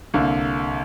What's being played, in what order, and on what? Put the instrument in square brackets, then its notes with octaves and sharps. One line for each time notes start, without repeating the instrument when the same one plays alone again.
[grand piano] C2 D3 A#3